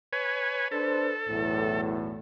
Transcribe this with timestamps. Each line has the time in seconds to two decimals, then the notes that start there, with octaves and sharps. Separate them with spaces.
0.13 B4 C#5 G#5
0.71 D4 A4 B4 C5
1.28 B1 E2 A2